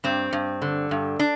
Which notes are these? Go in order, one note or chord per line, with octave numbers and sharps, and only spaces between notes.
G2 C4
G2
D3
G2
D4